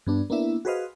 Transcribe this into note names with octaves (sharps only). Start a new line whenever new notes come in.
G2 B3 D4
A#3 B3 D4 E4 E5
F#4 G#4 B4 C5 D#5 F5